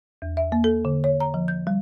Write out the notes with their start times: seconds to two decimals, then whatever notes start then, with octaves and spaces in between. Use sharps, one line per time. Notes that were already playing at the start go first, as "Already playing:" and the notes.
0.22 E2
0.37 E5
0.52 A#3
0.64 A4
0.85 D3
1.04 C#5
1.20 A#5
1.34 F3
1.48 G6
1.67 G3